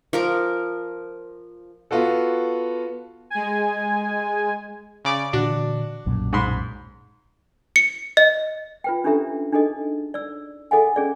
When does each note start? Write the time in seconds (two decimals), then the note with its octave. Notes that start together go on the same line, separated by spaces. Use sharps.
0.13 F3 A#4 D6
1.91 B3 F4 F#4 A4
3.30 G#3 G#5
5.05 C#3 D5 D6
5.33 A#2 D3 E3 D4 F#4
6.06 B1 F#2 A#2
6.33 G#2 B5 C6
7.76 C#7
8.17 D#5
8.84 F4 B4 G5
9.04 C#4 D4 G4 A4 E5 A#5
9.52 D4 D#4 G#4 A4 D#5
10.14 D5 E6
10.71 G#4 A4 D#5 F#5 G#5
10.96 C#4 G#4 D5